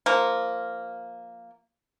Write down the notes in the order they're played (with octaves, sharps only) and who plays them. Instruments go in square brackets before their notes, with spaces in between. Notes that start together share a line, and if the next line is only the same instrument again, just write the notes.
[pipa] F3 A#3